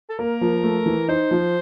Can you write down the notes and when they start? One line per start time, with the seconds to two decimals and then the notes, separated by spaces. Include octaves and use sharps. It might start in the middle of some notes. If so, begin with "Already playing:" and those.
0.10 A4
0.18 A#3 A#4
0.41 F3
0.63 A3
0.86 E3
1.08 D#4 C5
1.31 F3